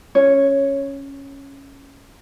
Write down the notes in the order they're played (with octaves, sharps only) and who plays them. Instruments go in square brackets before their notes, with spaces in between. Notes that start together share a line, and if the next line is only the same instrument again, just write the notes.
[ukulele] C#4 C#5